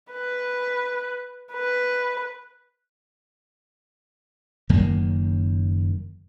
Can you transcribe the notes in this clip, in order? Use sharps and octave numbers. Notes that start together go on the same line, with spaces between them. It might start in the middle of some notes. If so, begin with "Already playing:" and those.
B4
B4
F#1 F#2 D#3 A#3